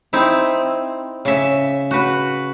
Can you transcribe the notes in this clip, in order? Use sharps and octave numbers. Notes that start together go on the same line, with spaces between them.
C4 D#4 E4
C#3 E5
F#4 B4